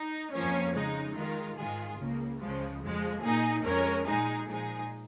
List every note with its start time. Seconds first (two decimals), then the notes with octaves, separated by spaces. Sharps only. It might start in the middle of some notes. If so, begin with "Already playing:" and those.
Already playing: D#4
0.33 F2 F3 A#3 C#4
0.75 C#3 G#3 D#4
1.15 D#3 G#3 F4 A#4
1.57 G#2 D#3 G#3 F4 G#4
1.98 C#2 C#3 A#3
2.40 C#2 C#3 F3 G#3
2.81 F2 F3 G#3
3.22 A#2 A#3 D#4 G#4
3.63 F2 F3 G#3 C#4 A#4
4.06 A#2 G#3 D#4 G#4
4.46 A#2 F3 G#3 D#4 G#4